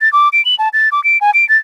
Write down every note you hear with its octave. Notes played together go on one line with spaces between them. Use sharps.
A6
D6
D7
F#7
A5
A6
D6
D7
G#5
D7
A6